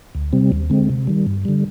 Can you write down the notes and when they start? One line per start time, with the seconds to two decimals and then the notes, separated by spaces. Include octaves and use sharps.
0.15 D2
0.33 C3 G3 C4
0.52 D#2
0.70 D3 G#3 C4
0.89 C3
1.07 D#3 G3
1.27 G2
1.45 D3 G3